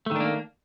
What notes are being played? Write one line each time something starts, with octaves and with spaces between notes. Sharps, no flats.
D#3 A3 A#3 D4